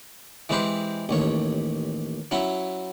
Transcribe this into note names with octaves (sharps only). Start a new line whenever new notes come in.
E3 G#3 C4 G4 B4 C5
A1 D#2 C#5
F#3 C#4 E4